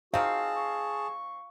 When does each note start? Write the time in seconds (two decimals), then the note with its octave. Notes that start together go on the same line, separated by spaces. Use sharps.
0.14 D#3 C4 F#4 G#4 F5 A5
0.57 C#6